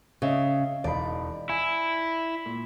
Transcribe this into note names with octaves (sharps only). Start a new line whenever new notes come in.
C#3 D#5 E5
E1 D#4 D5 B5
E4 G#5
A#2